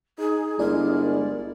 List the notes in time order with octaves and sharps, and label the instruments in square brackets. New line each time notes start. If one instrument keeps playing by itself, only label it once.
[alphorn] D#4 [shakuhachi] G#4
[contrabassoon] G1 [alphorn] G#3 [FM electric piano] E4 D5 [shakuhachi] A#4